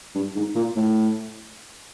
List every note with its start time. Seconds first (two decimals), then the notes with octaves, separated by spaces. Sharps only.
0.15 G2
0.36 G#2
0.55 A#2
0.76 A2